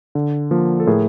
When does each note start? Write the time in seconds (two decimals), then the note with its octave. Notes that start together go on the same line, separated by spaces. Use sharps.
0.15 D3
0.51 F3 A#3
0.80 A4
0.87 A2 G#4 A#4